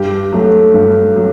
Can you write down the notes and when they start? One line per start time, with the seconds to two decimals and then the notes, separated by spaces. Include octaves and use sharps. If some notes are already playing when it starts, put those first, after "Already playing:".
Already playing: G2 G4
0.32 F#3 A3
0.74 G2
1.16 F#3